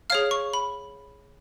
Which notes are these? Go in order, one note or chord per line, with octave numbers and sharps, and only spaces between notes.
G#4 C#5 F5 F6
C#6
B5